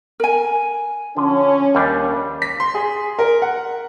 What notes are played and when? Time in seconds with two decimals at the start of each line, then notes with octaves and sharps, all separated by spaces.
0.20 A#4 G#5
1.17 D3 F3 C#4
1.75 D#2 G3 D4
2.42 B6
2.60 C6
2.75 G#4
3.19 A#4
3.42 F#5